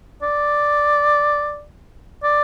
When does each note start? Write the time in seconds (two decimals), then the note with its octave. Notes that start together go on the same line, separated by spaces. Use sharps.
0.22 D5
2.23 D5